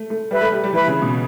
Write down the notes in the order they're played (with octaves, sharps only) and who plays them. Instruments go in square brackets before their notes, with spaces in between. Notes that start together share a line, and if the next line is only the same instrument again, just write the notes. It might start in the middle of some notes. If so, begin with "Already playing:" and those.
Already playing: [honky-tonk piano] A3
A3
[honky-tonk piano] G3 [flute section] B4 E5 B5
[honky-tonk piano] A3
G3
G3
[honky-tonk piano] E3 [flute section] B4 E5 B5
[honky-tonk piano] C#3
B2